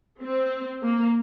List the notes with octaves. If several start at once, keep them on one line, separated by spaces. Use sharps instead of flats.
C4
A#3